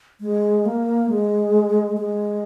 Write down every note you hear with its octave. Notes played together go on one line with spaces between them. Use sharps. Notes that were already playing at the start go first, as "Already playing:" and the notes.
G#3
A#3
G#3
G#3